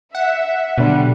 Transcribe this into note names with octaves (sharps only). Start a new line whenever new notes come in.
E5 F#5
B2 D3 F#3 G3